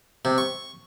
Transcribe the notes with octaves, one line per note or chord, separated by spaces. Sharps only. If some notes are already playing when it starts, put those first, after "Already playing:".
C3
C#6